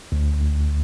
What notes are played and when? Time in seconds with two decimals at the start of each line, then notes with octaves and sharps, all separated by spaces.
0.12 D2
0.41 D2